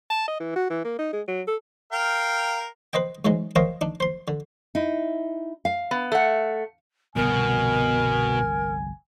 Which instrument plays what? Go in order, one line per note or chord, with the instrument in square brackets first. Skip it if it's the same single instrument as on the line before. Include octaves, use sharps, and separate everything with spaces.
[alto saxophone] A5
D#5
E3
F#4
E3
A#3
D#4
G#3
F#3
A4
[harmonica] A#4 F5 G5
[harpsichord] B4 C5 D#5 G5
G#2 E3 F#3 G#3 D#4
A#4 C5 C#5 D#5 F5 G5
D4 D#4
C5 C6
D3
[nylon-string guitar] D#4 E4
F5
[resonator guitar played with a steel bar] B3
A3 F#5
[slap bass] G1 C2 F3 [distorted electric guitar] B2 [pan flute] A#4 [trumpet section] G#5